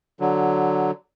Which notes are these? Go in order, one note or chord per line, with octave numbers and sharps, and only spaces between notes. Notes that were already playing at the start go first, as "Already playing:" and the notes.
D3 F#3